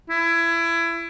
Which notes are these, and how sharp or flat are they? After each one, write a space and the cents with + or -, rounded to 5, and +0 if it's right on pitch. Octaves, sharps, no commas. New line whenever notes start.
E4 +25